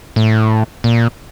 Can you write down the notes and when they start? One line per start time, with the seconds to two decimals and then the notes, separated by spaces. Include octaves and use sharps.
0.16 A2
0.84 A#2